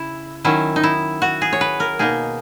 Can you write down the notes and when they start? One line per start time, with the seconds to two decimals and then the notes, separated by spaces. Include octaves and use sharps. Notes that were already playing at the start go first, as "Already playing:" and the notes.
Already playing: C#3 E4
0.44 D#3 F#3 C#4 E4
0.76 D#4
0.84 E4
1.22 F#4
1.42 G#4
1.53 C#5
1.61 B4
1.80 A#4
1.99 B2 A#3 D#4 G#4